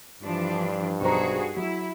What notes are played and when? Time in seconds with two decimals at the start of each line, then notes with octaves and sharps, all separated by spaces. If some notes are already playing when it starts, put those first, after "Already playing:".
0.22 G2 E3 F3 D4
1.01 B1 F#4 G#4 C5 A#5
1.56 F#3 E4